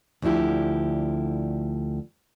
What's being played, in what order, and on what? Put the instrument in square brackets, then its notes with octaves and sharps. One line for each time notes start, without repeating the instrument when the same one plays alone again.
[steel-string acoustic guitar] D2 D3 F3 E4 G4